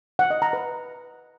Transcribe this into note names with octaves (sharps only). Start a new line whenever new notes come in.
F#5
D#5
A#5
B4